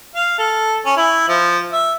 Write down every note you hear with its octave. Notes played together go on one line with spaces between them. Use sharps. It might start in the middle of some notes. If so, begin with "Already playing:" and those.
F5
A4
C#4
E4
F3
E5